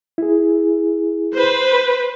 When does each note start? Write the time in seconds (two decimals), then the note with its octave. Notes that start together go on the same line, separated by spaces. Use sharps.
0.18 E4 G#4
1.34 B4 C5